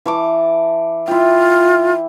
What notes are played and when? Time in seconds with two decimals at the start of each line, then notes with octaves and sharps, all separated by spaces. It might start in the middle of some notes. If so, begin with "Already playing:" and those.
0.06 E3 A5 D6
1.08 E4 F4 G5